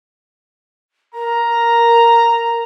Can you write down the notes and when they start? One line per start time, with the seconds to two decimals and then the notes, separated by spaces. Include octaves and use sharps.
1.14 A#4 A#5